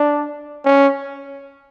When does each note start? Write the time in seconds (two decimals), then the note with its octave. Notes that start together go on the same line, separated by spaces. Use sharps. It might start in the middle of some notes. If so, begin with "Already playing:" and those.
Already playing: D4
0.65 C#4